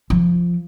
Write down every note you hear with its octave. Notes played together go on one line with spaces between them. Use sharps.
F3